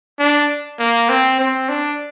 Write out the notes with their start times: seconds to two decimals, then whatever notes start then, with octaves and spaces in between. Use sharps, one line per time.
0.19 D4
0.79 A#3
1.09 C4
1.39 C4
1.69 D4